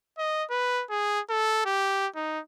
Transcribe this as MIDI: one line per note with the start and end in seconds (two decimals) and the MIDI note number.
0.18 0.44 75
0.50 0.84 71
0.90 1.21 68
1.29 1.63 69
1.65 2.08 67
2.15 2.40 63